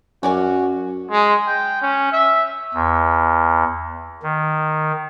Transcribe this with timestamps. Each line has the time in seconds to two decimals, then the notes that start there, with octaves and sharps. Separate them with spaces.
0.23 F#2 C#4 F#4 D5 G#5
1.11 G#3
1.47 G5
1.81 C#4
2.12 E5
2.74 E2
4.23 D#3